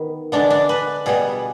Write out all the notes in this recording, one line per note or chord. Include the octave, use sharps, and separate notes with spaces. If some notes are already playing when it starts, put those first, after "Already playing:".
Already playing: D#3 B3
D3 G#3 B3 D4
D4
B4
B2 G3 B3 G#4